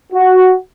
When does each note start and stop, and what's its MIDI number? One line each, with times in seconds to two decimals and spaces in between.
0.13 0.53 66